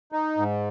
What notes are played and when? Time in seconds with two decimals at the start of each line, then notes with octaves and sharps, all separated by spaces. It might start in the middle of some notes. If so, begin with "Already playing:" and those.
0.12 D#4
0.37 G#2